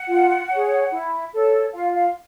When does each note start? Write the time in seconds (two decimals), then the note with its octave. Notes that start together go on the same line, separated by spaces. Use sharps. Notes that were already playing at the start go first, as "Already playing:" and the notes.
Already playing: F#5
0.08 F4
0.50 G#4 C#5
0.91 E4
1.33 A4 C#5
1.73 F4 F5
1.94 F5